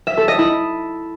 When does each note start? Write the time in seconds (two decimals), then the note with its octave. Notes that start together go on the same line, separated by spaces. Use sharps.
0.07 E5
0.17 A4
0.28 D#5
0.39 E4